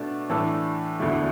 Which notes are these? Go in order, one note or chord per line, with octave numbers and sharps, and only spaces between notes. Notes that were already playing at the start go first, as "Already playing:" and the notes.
Already playing: B2 A3 D4
A2 E3 A3 D4 A4
E1 D2 D3 A3 E4